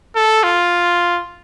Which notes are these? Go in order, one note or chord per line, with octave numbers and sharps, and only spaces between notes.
A4
F4